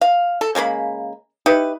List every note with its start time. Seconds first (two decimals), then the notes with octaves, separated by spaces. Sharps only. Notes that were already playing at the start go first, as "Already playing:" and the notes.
0.01 F5
0.41 A4
0.55 C#3 G#3 A#3 B5
1.46 D#4 E4 G4 B4